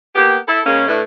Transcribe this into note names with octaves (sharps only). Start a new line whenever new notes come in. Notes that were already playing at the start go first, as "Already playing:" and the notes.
A#3 B3 G4
E4 A4
C#3 G#3 A#3 C#4
A2 A3 D4 E4 B4